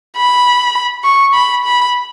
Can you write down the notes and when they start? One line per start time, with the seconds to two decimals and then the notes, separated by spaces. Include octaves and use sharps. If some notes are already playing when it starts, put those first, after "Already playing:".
0.17 B5
1.05 C#6
1.34 B5
1.65 B5